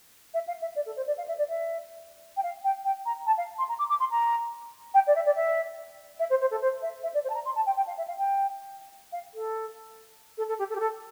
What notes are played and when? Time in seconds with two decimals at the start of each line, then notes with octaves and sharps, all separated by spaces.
0.34 E5
0.47 F5
0.61 E5
0.75 D5
0.86 A4
0.96 C5
1.07 D5
1.17 F5
1.28 E5
1.38 D5
1.49 E5
2.36 G5
2.43 F5
2.64 G5
2.84 G5
3.05 A#5
3.26 A5
3.37 F5
3.58 C6
3.69 A#5
3.78 D6
3.89 D6
3.99 C6
4.10 A#5
4.94 G5
5.07 D5
5.15 E5
5.25 D5
5.35 E5
6.19 E5
6.30 C5
6.40 C5
6.50 A4
6.61 C5
6.82 E5
7.03 E5
7.14 D5
7.24 C5
7.29 A5
7.34 A#5
7.45 C6
7.55 A5
7.66 G5
7.76 G5
7.87 F5
7.97 E5
8.07 F5
8.18 G5
9.12 F5
9.34 A4
10.37 A4
10.48 A4
10.58 G4
10.69 A4
10.75 G4
10.79 A4